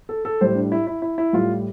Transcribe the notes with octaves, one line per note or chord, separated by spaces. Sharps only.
A4
A4
A2 G3 C5
D4
E4
E4
E4
E4
A2 G3 F4